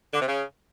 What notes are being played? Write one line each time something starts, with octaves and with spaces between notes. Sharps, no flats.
D3
C3
C#3